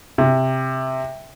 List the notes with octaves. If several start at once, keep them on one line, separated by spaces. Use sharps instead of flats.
C3